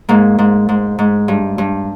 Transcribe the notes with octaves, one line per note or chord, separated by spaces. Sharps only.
G#2 A#3
G#2
G#2
G#2
G2
G2